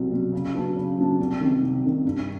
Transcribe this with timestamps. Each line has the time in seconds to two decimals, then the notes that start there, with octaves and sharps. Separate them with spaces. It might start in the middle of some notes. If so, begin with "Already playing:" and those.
Already playing: C2 B2 F#3
0.12 B2 F#3
0.33 C#3
0.55 F#3 B3 D4
0.76 C#3
0.98 F#3 B3 D4
1.19 C2
1.41 C3 D#3
1.62 C2
1.84 C3 D#3
2.05 G2